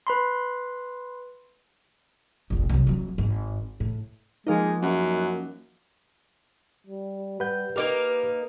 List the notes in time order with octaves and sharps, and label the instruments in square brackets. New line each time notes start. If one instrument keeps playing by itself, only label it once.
[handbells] B4 B5 C6
[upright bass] F1 A#1
C2 F#3
D#1 F#3
G#1 G#2
A2
[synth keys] F3 A#3 D#4 [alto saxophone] G#3
[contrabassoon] F#2 [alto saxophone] F#5
[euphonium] G3
[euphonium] G3 [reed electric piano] B4 F#5 G6
[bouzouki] A#3 D#4 A#4 [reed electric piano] G4 D6 [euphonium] B4